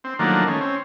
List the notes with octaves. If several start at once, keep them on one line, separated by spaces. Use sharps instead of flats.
C4
D#3 F3 F#3 A3 A#3 D4
D#3 A3 C#4
C4 C#4